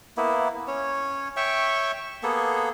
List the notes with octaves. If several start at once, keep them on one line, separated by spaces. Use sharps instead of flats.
A#3 B3 E4
C#4 C#5
C#5 E5 G5 C#6
A#3 B3 G#4 A4